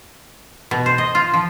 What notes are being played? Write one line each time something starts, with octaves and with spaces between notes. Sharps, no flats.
B2
C5
D#5
F4
F3